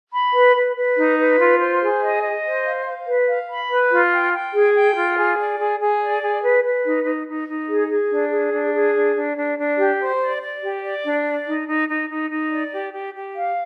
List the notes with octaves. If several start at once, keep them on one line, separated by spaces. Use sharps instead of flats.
B5
B4
B4
B4
D#4
B4
F4
C5
G#4
D#5
D#5
C5
F5
F5
B4
F5
B5
B4
F4
G5
G5
G#4
G5
F4
G#4
D5
G#4
G#4
D5
G#4
B4
B4
D#4
D#4
D#4
D#4
G#4
G#4
D4
G#4
D4
G#4
D4
D4
D4
D4
G4
C5
D5
D5
G4
D5
D4
D5
D#4
D#4
D#4
D#4
D#4
D5
G4
G4
G4
F5